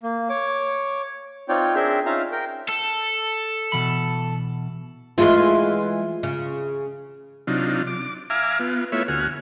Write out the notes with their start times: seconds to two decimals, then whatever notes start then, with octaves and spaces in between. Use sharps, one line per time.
0.03 A#3
0.29 C#5 D6
1.49 C4 D#4 F4 C#5 D5 G5
1.75 C4 D4 G#4 A#4 E5 G6
2.06 C#4 D#4 F4 E5 F5 A#5
2.32 A#4 G5
2.69 A4
3.72 B2 E3 B5
5.18 E3 G#3 A3 F4 C6
6.23 C#3
7.47 C3 F#3 D4 D#4 F4
7.87 D6
8.30 E5 F5 G#5 A#5 D6 F6
8.60 B3 F4
8.92 A3 B3 E4 F4 C#5 E5
9.08 D2 F#4 G#5 F6